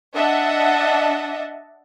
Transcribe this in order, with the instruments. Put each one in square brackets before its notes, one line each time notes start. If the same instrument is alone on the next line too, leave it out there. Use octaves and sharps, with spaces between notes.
[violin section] D4 D#5 E5 F#5 A5